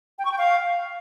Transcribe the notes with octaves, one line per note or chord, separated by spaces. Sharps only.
G5
C#6
G5
F5